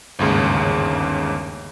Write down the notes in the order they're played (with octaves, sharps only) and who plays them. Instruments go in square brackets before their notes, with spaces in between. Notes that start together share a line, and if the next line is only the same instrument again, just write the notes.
[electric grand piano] G1 D#2 G#2 C#3